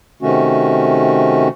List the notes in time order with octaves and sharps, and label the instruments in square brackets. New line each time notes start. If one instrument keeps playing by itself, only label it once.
[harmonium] C3 D#3 A3 C#4 F#4